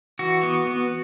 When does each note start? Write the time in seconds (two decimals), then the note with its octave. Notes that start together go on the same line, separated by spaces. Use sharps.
0.19 E3 F#4
0.43 B3
0.67 B3